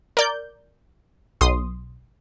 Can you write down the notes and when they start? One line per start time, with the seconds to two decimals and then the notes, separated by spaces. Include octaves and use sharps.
0.17 A#4 D5 G6
1.41 B1 C6 D#6